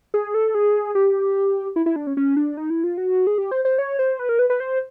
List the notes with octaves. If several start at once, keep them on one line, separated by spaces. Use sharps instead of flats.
G#4
A4
G#4
G4
E4
E4
D4
C#4
C#4
D4
D#4
E4
F4
F#4
G#4
G4
C5
C5
C#5
C5
B4
A#4
B4
B4
C5